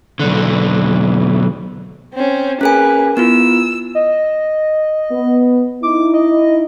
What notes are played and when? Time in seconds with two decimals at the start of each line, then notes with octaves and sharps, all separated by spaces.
0.20 B1 D3
2.14 C4 C#4
2.61 A#3 C#4 G#4 B4 G#5
3.17 B3 E4 F4 E6
3.95 D#5
5.12 B3
5.83 D#4 E4 D6
6.14 D#5